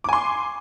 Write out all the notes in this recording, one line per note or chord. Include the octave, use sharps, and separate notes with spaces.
G#5 C6 D6